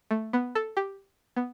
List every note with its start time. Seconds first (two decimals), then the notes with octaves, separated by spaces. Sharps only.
0.11 A3
0.33 B3
0.55 A4
0.77 G4
1.36 B3